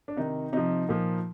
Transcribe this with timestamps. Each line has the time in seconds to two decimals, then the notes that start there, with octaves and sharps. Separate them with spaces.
0.08 D4
0.17 C3 D#3 D#4
0.53 C3 F3 D#4
0.89 A#2 F3